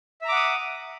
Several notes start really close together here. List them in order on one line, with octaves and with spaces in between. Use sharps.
E5 A#5 D6 F#5 D#6